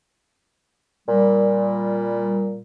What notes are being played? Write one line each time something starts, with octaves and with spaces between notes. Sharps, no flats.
A#2 G3